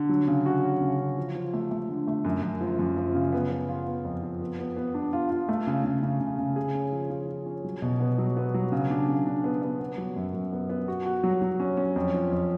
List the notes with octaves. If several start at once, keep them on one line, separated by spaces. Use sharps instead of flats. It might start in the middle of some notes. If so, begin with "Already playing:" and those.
Already playing: D3
F#3
C#3
F#4
C#4
C#3
C#3
F3
F3
A3
A3
D3
A3
F#2
F#2
F3
F#2
F3
C#3
B3
B3
F4
B3
F2
F3
B3
B3
B3
D4
F4
F4
A3
C#3
C#3
C#3
C#3
C#3
G#4
C#4
F3
F3
F3
C#4
F#3
B2
B3
F#3
B3
F#3
C#3
D4
C#3
D4
B3
B3
B3
F#3
F#2
F#2
B3
B3
F#4
F#4
F#3
F#3
C#4
C#4
F2
F3
F2